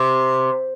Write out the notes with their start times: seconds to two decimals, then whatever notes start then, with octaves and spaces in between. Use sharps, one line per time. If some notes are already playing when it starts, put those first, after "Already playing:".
Already playing: C3